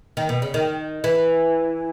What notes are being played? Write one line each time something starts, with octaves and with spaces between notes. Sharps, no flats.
D#3
B2
C#3
D#3
E3